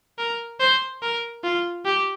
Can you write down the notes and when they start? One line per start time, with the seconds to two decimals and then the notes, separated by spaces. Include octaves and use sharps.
0.19 A#4
0.60 C5
1.02 A#4
1.44 F4
1.86 G4